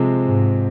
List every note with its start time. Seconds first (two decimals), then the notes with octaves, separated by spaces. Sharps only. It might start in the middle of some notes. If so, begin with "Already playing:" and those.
Already playing: C3 F3 G#3 C4
0.25 G#2